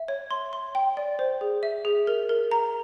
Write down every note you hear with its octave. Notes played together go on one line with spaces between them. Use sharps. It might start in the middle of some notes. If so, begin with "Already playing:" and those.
Already playing: E5
C#5
C6
C6
G5
D5
C5
G#4
E5
G#4
A#4
A#4
A#5